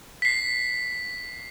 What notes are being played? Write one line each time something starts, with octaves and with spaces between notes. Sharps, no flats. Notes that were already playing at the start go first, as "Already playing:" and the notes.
B6 C7